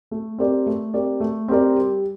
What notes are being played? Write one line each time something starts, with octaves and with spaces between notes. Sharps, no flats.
A3
C4 G4 A#4 D5
A3
C4 G4 A#4 D5
A3
C4 G4 A#4 D5
G3